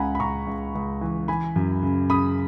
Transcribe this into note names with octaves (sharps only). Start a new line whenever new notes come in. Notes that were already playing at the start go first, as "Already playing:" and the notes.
Already playing: C#2 C#3 F#5 G#5 A#5 B5
B5
C#3 A#5 C#6
C#2
C#2
E3
E3 G#5 B5
F#2
C#3
C#3 B5 D#6